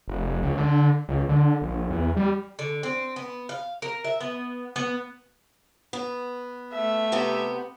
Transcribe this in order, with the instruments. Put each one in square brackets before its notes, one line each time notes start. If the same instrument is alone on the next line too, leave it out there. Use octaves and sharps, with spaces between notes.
[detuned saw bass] F1
C#2
D3
C#2
D3
A#1
E2
G3
[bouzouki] D3
C4
B3
F5
A#4
E5
B3
B3
[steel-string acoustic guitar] B3
[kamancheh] A3 E5
[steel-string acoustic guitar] C3 B3 G4